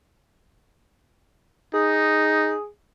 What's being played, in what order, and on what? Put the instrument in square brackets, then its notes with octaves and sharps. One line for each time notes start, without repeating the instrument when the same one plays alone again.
[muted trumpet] D#4 [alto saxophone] G#4